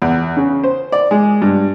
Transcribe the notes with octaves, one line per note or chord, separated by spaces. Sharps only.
E2
C#3
C5
D5
G#3
G2